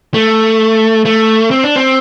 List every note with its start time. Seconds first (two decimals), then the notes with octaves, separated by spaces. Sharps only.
0.14 A3
1.05 A3
1.51 C4
1.64 D4
1.76 C4